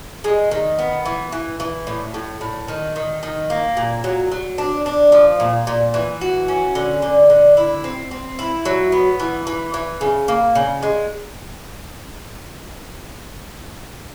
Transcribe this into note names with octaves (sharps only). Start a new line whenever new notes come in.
G#3
D#3
B3
E3
E3
E3
A2
A2
A2
D#3
D#3
D#3
A#3
A#2
F#3
F#3
D4
D4
F3
A#2
A#2
E3
F#4
C#4
D3
D3
D3
E4
C4
C4
E4
F#3
B3
E3
E3
E3
C#3
A#3
C#3
G#3